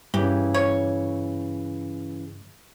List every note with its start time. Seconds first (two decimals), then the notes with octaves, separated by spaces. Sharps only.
0.14 G2 C#3 E3 G4
0.54 C#5